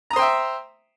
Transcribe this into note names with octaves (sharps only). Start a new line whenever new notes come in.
C5 E5 G5 A#5 D#6